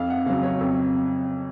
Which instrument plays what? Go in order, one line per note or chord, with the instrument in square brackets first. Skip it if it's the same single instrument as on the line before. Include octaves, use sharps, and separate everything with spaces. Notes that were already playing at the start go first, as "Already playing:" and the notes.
Already playing: [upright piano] F2 F5
F#5
C#3 F#3 F5
C#5
F2